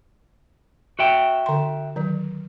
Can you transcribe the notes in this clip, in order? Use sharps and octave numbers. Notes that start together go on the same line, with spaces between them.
F#4 E5 G5
D3 C6
D#3 F#3